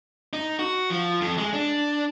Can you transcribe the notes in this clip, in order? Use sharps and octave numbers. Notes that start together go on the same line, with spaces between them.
D#4
F#4
F3
F2
G#3
D4